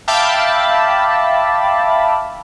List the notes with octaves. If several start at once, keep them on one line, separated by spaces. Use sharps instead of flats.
E5 F5 G5 A5 B5 D6